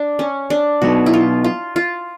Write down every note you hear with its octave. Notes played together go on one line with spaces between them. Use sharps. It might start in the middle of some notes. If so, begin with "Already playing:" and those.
Already playing: D4
C#4
D4
B2 F#3 B3 D#4 F#4
E4
F4
F4
F4